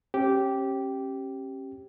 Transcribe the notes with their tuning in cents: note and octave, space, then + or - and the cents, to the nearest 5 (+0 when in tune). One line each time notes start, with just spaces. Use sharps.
C#4 -40 G4 -10